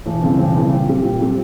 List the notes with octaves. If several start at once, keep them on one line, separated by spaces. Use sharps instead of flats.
E1
E2 C#3 G3 C4
E1
E2 C#3 G3 C4
A#2
G3 C4 G4
A#2
G3 C4 G4